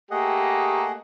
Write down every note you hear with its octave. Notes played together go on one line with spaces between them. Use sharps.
A3 A#3 G4 G#4 D#5 F#5